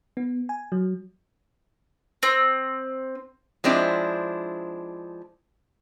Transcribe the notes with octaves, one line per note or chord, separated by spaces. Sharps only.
B3
G#5
F#3
C4
F3 G#3 C4 D4 E4